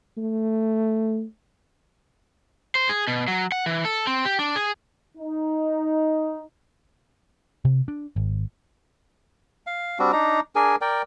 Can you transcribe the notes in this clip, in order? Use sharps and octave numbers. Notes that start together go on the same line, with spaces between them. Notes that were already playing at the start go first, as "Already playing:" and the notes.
A3
C5
G#4
B2
F#3
F#5
E3
A4
C4
G4
D4
G#4
D#4
C3
D4
G#1
F5
G3 C4 D4 F#4
D4 D#4 A#5
D4 G#4 A#4 G#5
A#4 D5 G5